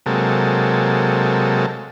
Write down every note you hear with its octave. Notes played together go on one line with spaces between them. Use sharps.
C3 F#3 G#3 A#3 A4